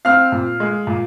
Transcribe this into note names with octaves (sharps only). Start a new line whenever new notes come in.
C4 F5 F6
A#2
G#3
A#2